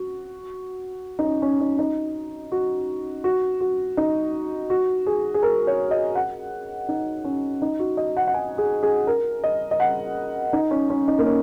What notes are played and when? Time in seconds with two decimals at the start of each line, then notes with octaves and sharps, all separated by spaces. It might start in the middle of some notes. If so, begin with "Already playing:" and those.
Already playing: F#4
1.19 D#4
1.24 C#4
1.42 C#4
1.60 D#4
1.79 D#4
2.52 F#4
3.24 F#4
3.61 F#4
3.97 D#4
4.70 F#4
5.07 G#4
5.34 G#4
5.43 A#4
5.67 C#5
5.91 D#5
6.15 F#5
6.89 D#4
7.24 C#4
7.62 D#4
7.79 F#4
7.97 D#5
8.17 F#5
8.28 F#5
8.34 G#5
8.58 G#4
8.83 G#4
9.07 A#4
9.44 D#5
9.71 D#5
9.80 F#5
10.53 D#4
10.71 C#4
10.90 C#4
11.08 D#4
11.19 A#3
11.26 C#4